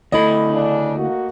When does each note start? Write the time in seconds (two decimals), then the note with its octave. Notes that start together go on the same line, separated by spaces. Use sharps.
0.12 D2 A3 E4 D#5 B5
0.50 C#3 D4
0.96 A#3 F#4